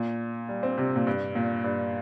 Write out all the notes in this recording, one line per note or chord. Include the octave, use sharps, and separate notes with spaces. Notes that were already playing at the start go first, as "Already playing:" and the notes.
Already playing: A#2
G3
C4
C3
A#2
G2
A#2
G2